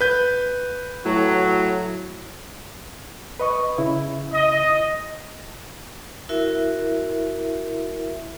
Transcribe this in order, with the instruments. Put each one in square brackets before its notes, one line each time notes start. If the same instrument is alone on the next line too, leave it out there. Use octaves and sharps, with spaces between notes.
[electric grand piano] B4 G6
[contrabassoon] A2 [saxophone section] F#3
[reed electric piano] B4 D#5 C#6
C#3 E4
[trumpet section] D#5
[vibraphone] E4 F#4 A#4 E5